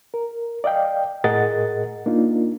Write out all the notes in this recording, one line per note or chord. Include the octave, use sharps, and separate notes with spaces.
A#4
D5 D#5 F5 G5
A2 G#4 A#4 D#5 F#5 A6
A#3 D4 D#4 F4